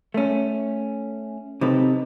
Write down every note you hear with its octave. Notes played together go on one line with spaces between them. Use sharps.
A3 C#4
C3 F#3 C4 D#4 A4 B4